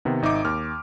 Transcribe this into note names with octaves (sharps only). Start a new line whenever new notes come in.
C3 D#3 B3
G#1 D#4 E5 D6
D#2 F6